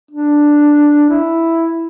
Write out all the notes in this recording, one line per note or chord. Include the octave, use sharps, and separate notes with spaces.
D4
E4